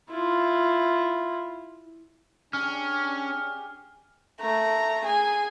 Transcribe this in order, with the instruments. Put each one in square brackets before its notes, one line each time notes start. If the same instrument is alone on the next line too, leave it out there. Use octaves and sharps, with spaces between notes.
[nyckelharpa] E4 F4
[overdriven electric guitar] C#4 [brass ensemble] D4 [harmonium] G4 G#4 G#5 [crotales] F6
[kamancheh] A3 A#5
G#4 G#5